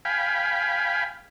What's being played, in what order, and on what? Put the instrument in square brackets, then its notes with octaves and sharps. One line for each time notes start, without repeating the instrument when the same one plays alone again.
[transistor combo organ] F5 G5 G#5 B5